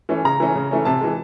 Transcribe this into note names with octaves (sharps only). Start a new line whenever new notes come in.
E3 A3 C#4
C#3 A#5
E3 A3 C#4
C#3
E3 A3 C#4
C3 A5
E3 G#3